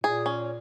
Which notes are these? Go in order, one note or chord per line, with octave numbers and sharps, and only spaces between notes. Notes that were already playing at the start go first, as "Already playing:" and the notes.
A#2 G#4
C#4